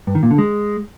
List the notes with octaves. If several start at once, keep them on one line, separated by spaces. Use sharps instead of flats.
G2
D#3
A#2
D3
G#3